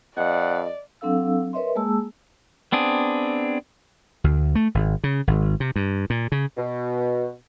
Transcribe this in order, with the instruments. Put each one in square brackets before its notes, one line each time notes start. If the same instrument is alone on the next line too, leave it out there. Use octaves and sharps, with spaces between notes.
[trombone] F2 [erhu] D5 [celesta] D#5 [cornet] F#5
[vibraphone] F#3 C4 D4 A4 F5 E6
A#4 B4 C#5 D#5 E5 C6
G#3 A#3 G#4 A5 E6
[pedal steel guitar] B3 C4 D4 G#4
[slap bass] D2
A3
G#1
C#3
G#1
C3
G2
A#2
C#3
[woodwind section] B2